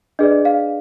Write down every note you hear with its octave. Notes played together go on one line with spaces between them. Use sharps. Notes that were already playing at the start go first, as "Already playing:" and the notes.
D4 G#4 B4 D5 D#5
F5